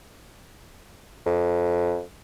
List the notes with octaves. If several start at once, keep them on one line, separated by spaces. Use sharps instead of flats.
F2